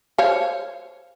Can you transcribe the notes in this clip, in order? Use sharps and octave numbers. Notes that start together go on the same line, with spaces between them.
C5 C#5 F5